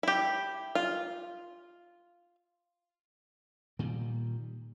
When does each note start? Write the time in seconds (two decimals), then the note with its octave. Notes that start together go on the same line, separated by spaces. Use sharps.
0.03 E4 G4
0.75 F4
3.79 A#2 D#3 G3